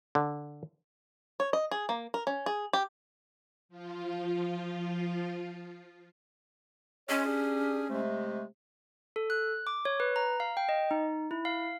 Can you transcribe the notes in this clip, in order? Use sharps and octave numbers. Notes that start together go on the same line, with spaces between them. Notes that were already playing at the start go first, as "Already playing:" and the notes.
D3
C#5
D#5
G#4
A#3
A#4
C#4
G#4
G4
F3 F4
G#3 C#4 F4 C#5
D4 G4 G#4
C3 G#3 A3
A4
F#6
D6
C#5
B4
A#5
F5
G5
D#5
D#4
E4
F5